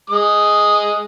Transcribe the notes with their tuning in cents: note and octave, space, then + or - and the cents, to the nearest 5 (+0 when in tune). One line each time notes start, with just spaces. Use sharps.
G#3 +0 D#6 +0